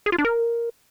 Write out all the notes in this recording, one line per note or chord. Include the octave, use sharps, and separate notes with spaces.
G#4
F4
D4
A#4